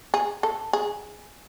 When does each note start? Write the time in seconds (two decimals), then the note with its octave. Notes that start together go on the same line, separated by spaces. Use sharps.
0.14 G#4
0.43 A4
0.73 G#4